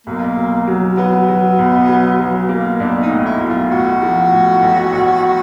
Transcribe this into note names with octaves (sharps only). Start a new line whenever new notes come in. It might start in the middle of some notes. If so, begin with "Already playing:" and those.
B1 A#3
B1
F#3
F#3 B3
F#3
B1
F#3
F#3
A#3
B1 D4
D#4
A2
E4
B1
F4
A2 F#4
F3
A2
A1
A1